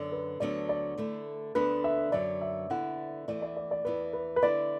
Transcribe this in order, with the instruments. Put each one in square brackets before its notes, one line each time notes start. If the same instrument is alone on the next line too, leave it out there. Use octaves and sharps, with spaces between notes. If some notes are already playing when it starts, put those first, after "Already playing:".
Already playing: [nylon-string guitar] F#2 D3 B3 [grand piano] D5
[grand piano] B4
[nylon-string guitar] D2 D3 F#3 B3 D4 [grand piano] D5
[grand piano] D5
[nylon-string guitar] D3 A3 E4
[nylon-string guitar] D2 D3 B3 D4 [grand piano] B4
[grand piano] E5
[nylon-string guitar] F#2 D3 F#3 [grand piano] D5
[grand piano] E5
[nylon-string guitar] D3 B3 E4 [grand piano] F#5
[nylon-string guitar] E2 E3 A3 E4 [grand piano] D5
[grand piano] D5
D5
D5
[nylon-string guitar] E2 E3 B3 E4 [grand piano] B4
[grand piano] B4
B4
[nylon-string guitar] D3 B3 E4 [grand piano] D5